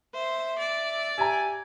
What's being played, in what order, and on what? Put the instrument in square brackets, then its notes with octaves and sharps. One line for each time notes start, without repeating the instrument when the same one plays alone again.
[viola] C5 [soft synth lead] E5
[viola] D5
[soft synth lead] G4 [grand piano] E5 A#5 [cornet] G#5